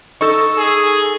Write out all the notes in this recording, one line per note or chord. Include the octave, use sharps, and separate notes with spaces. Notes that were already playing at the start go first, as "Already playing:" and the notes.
D#4 A4 C#6 E6
G#4